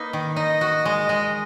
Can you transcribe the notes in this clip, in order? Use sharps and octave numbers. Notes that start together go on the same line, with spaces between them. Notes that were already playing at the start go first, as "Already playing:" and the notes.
Already playing: A#3 D#4 B4
D#3
D#4 D#5
F#4
G#3
G#3